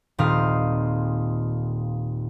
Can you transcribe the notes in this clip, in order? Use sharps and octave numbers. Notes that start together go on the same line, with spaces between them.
D#1 A#2 D#3 C4 F5 D#6